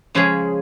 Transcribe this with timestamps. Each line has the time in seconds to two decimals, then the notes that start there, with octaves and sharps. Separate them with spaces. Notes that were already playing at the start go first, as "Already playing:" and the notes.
0.15 C#3 F3 G#3 C#4 G#4